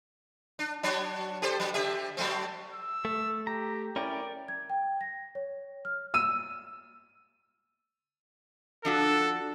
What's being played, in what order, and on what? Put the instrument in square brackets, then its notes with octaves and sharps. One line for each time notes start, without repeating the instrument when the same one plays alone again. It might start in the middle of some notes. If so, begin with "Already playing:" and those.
[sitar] D4
F#3 D4 C#5
G4 A4 C5
F#3
D3 G4 E5
F#3 A3 C4
[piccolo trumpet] E6
[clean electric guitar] A3
[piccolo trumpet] G4 [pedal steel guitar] A#5
[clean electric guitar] C#4 E4 [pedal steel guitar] A#4 G5 [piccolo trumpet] D5
[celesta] G#6
G5
A#6
C#5
F6
[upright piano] E6 D#7
[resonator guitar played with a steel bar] F3 D4 F#4 [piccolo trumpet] A4